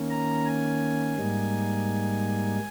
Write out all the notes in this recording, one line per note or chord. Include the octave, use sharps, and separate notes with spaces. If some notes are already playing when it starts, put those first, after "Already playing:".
Already playing: D#3 A#3 C#4
A#5
G#5
G#2 G3 A#3 D#4